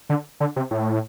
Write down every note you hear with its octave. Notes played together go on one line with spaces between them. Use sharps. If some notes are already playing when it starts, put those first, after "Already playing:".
D3
D3
C3
A2